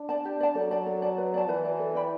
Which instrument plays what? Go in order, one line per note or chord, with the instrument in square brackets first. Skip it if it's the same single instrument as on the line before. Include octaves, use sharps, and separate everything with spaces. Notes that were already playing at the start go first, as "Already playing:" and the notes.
Already playing: [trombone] D4
[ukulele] D5 A5
G4
D5 A5
[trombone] F#3 [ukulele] A4
[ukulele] D5 A5
A4
D5 A5
B4
D5 A5
[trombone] E3 [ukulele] B4
[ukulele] D5 A5
A4
D5 G5 B5